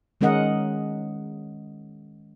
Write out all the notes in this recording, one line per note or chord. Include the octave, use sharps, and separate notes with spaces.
D#3 G#3 C#4 A#4 D#5 F#5